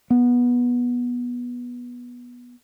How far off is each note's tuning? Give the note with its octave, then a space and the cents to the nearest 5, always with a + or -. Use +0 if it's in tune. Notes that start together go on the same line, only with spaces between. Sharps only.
B3 -15